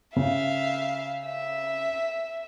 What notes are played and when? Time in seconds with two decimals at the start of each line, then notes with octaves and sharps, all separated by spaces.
0.16 C#3 E5 F5
1.25 E5